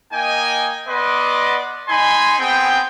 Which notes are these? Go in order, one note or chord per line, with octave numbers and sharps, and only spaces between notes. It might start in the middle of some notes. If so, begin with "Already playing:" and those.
A#3 D#4 D#5 G5 G#5
B3 B4 D5 D#5 C6 D6
D#4 G#5 B5 C6
B3 C4 G#4 G5